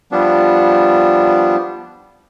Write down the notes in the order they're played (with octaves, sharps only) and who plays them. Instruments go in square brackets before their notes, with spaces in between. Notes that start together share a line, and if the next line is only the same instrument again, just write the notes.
[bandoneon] F3 G3 B3 D4